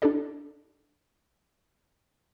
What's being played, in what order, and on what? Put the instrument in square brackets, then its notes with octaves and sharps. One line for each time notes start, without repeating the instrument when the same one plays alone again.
[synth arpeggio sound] D4 E4 G4 A4 D5 D#5